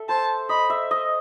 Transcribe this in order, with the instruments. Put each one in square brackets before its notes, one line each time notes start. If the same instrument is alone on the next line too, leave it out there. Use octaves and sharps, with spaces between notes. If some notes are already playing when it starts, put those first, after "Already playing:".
Already playing: [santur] A4 E5
[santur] C5 [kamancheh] A5
[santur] D#5 [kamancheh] B5
[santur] E5
D#5